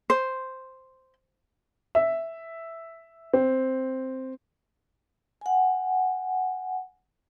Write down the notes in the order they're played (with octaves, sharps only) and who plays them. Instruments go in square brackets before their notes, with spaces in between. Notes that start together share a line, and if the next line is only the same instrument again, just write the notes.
[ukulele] C5
[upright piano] E5
C4
[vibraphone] F#5 G#5